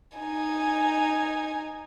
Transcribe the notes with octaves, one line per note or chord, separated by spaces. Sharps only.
D#4 G#5